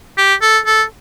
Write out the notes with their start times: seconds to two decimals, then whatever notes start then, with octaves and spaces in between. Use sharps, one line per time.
0.18 G4
0.41 A4
0.66 A4